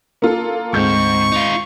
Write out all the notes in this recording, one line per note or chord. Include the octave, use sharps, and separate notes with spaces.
A#3 F4 A4
D2 G#2 G#3 C4 C#6 G6
D#4 F4